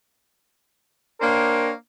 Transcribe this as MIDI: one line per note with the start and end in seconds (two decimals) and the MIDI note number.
1.21 1.71 58
1.21 1.71 62
1.21 1.71 70
1.21 1.71 72
1.21 1.71 73
1.21 1.71 79